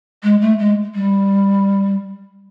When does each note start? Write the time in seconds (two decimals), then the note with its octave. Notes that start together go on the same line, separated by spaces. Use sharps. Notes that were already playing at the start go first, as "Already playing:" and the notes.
0.23 G#3
0.41 A3
0.59 G#3
0.95 G3